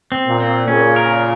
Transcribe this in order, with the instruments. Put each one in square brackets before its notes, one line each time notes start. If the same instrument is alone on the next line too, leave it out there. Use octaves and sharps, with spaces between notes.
[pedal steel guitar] C4
[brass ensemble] A#2
[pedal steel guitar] C4
[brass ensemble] A#2 C#3 [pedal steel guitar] C#4
[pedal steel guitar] A#4